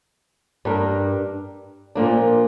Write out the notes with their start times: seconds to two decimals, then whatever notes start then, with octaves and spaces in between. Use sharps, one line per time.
0.65 G2 G3 D4 A#4
1.95 A#2 F3 A#3 D4